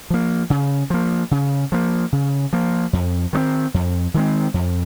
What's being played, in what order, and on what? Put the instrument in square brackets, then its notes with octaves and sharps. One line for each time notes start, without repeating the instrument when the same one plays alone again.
[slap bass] F3 A#3
C#3
F3 A#3
C#3
F3 A#3
C#3
F3 A#3
F2
D#3 G#3 C4
F2
D#3 G#3 C4
F2